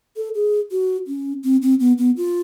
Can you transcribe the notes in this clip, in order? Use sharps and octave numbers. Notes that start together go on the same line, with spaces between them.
A4
G#4
F#4
C#4
C4
C4
B3
B3
F4